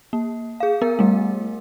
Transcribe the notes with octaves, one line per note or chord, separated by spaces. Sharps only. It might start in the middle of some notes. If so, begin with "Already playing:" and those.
A#3
G#4 F5
B3 A#4
G3 A3